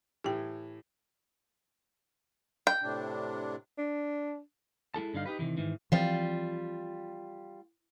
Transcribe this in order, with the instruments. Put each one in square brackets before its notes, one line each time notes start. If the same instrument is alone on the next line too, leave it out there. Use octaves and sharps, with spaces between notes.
[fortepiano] A2 E3 [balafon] G4 G5
[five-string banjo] G5
[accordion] A2 C3 D4
[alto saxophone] D4
[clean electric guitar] G#3 E4 A4 A5
G2 D3 D#4 F5
D#4 G4 B4
C3 D#3 E3
G#2 D#3 E3
[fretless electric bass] E3 F3 C4 [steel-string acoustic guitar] G3 F4